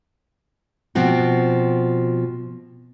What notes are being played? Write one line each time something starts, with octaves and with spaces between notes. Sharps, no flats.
B2 F3 C4 F#4